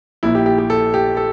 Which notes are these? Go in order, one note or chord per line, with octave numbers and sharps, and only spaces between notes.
A#1 A#2 E4
G4
G4
G4
A4
G4
A4